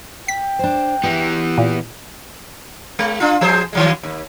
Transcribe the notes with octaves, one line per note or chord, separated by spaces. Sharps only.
G5 B6
D4 C5
E3 B3 G4
A#2
G#3
D4 F4
F3 G#4 C5
D#3 F#3 G#3
D#2